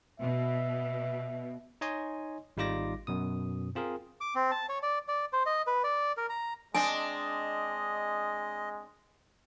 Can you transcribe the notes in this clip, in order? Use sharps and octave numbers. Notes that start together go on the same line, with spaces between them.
B2 E5
D#4 C#5 D#5 G#5 C6
G#1 G3 D#4 F4 D6 A#6
F#2 B2 D#6
C4 F4 G#4 A#4
D6
C4
A5
C#5
D5
D5
C5
D#5
B4
D5
A#4
A#5
G#3 C4 D4 D#5 G#5